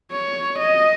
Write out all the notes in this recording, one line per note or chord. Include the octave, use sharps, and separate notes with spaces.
C#5
D#5